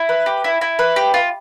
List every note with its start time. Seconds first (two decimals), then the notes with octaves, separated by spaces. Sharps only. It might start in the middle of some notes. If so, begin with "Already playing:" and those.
Already playing: E4
0.09 B4
0.26 G4
0.44 E4
0.61 E4
0.79 B4
0.96 G4
1.14 F4